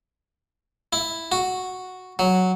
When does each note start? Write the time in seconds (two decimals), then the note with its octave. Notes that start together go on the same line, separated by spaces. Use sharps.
0.93 E4
1.32 F#4
2.19 F#3